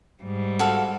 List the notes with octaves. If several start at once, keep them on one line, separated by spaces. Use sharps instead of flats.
G#2 G3
F#4 A4 F5